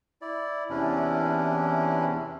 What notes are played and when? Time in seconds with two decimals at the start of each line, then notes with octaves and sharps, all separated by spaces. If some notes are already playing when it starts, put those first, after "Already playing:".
0.22 E4 D5
0.70 E2 C3 E3 C#4 D4 E4